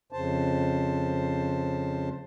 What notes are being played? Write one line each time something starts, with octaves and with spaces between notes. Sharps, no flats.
F2 C#3 C5 A5